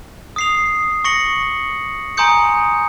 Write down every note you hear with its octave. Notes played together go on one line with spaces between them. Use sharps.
D#6 C7 F7
C#6 A#6 C#7 F#7
G#5 A#5 C6 D#6 G6 C#7